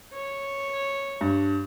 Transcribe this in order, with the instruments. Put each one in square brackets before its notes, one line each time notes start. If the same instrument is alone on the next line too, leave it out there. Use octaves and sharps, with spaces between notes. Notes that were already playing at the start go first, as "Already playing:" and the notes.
[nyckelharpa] C#5
[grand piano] G2